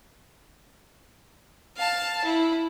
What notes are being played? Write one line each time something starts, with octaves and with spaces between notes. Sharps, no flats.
F5 A5
E4